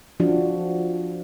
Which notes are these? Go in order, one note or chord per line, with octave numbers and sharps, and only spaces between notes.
F3 D4 F#4